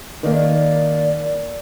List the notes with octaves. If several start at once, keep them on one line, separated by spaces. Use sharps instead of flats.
D#3 A#3 D5